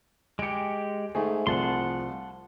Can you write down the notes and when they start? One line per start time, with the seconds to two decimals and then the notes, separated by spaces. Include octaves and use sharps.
0.39 G#3 G4 C#7 D7
1.15 G#2 A3 G#4
1.47 C2 F3 F#5 A5 C6